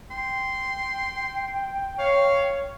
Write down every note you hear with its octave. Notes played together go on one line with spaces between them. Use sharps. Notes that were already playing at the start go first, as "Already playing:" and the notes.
G5 C6
C#5 F5